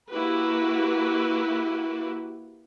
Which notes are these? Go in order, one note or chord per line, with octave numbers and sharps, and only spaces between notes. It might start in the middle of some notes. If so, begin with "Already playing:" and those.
A#3 E4 F#4 G4 B4